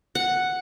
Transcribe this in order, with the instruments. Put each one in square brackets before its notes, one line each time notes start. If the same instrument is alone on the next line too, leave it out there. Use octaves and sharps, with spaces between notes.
[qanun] F#5